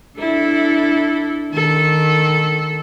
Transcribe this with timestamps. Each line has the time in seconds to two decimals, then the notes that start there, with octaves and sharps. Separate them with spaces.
0.18 D4 E4 A4
1.52 D#3 A4